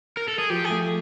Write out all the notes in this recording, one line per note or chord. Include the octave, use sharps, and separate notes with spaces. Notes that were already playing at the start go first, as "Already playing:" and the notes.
A#4
A4
G#4
F3 G4
G#4
A3